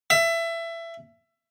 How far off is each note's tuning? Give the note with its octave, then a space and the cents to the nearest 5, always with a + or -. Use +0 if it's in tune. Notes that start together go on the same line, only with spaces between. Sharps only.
E5 +20